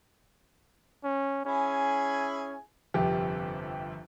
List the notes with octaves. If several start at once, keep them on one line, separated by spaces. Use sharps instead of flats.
C#4
C#4 E4 G#4 G#5
G1 F2 C3 G4